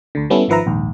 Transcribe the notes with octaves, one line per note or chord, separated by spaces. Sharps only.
D2 D3
G3 B3 C#4 E4 A4
G#1 D#3 F3 B4 E5 A#5
A#1 D#2 G#2